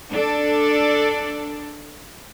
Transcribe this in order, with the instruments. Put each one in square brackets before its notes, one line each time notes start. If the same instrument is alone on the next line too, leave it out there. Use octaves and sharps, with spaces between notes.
[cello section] D4 A4 D5